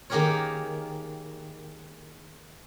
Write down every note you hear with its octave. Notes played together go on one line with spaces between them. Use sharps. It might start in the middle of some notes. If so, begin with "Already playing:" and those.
D#3 A#3 G4 G#4 A#4 C#5